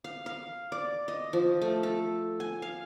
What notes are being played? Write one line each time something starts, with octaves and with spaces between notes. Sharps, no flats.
F5
F5
D5
D#5
F3
A3
A4
G#5
F5